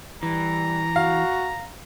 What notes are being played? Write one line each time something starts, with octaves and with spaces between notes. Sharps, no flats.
E3 G3 A#5
F#4 F5